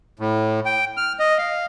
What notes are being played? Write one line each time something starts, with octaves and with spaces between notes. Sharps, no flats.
A2
G5
F6
D#5
F5